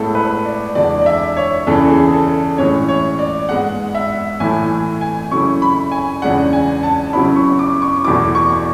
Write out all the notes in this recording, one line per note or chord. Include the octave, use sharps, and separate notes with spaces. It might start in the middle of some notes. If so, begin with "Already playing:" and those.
Already playing: A2 G#3 B3 E4 A4
B4
D5
E2 D3 G#3 D4 D5
D5
E5
C#5
E2 C#3 E3 A4
G#4
A4
A2 E3 G#3 C#4 C#5
C#5
D5
G#2 G#3 B3 F#5
E5
A2 E3 A3 E4 G#5
G#5
C#3 F#3 A3 E4 C#6
B5
G#5
E2 C#3 G#3 D4 F#5
G#5
A5
C#3 F#3 B3 E4 B5
C#6
D6
C#6
E2 B2 A3 E4 D6
C#6